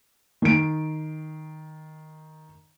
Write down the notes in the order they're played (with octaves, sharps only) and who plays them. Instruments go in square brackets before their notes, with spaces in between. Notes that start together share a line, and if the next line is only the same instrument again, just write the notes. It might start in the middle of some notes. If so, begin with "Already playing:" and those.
[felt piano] D#3 D7